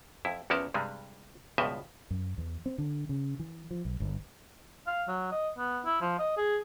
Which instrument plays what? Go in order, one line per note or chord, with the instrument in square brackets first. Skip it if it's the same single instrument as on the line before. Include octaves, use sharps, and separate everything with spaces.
[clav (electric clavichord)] F2 E4
E2 E3 F3 C#4 A#4 A5
G2 C3 G3 G#3
C#2 G2 B2 F3 D#5 E5
[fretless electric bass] F#2
E2
C4
D3
C#3
E3
F3
B1
G1
[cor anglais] F5
F#3
D#5
B3
E4
F3
D#5
G#4